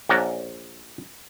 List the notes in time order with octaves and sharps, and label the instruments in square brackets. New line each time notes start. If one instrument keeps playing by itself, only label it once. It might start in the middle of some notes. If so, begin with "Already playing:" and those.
[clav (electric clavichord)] A#1 C#4 D5 F#5 A#5